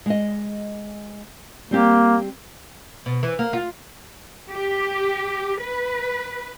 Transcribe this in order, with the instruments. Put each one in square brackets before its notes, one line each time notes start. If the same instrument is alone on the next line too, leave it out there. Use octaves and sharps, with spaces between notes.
[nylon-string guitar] G#3 D#5
[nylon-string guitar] G3 C4 G4 [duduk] A#3
[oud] B2
E3
A#3
F4
[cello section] G4
B4